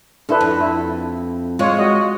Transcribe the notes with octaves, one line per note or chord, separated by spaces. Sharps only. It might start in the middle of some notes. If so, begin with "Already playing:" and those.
D4 E4 A4 B4
F2
E4
G#3 F4 C#5
F#4 D#5